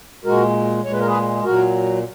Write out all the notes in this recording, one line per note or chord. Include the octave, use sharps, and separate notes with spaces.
A#2 G#3 F#4 A#4
A#2 G#3 C#5
B4
A#4
G#4 B4
A#2 F#3 F#4 A#4